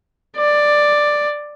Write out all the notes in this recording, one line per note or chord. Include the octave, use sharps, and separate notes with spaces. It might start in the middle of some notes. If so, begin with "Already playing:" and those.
D5